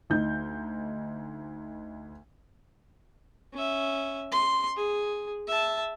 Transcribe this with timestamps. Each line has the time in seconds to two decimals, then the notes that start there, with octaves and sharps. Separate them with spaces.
0.10 D2 D#4 G6
3.53 C#4 E5
4.32 C6
4.77 G#4
5.48 E5 A5